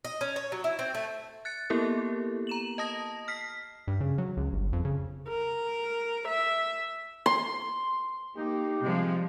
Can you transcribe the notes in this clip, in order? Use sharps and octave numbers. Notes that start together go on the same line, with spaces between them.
D#5
C#4
C#5
F#3
E4
C4
A3
F#6 A6 C#7
A#3 B3 E4 G4 A4 A#4
A#5 E7 F#7
D#5 A5 D#6 A#6
F6 B6 C7
G2
C#3
F#3
C#2
G1
F2
C#3
A#4
E5
C6
A#3 D#4 G4
C3 F3 G3 G#3